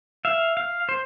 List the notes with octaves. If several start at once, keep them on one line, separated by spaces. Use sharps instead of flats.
E5 F5
F5
C5